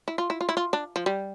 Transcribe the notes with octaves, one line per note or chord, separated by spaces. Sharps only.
E4
F4
E4
F4
E4
F4
D4
F3
G3